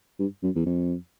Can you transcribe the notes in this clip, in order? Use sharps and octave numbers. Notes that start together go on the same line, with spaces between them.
G2
F#2
E2
F2